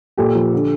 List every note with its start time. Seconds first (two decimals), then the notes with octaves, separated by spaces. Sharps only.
0.18 A#2 G4 A4
0.35 F3
0.53 D3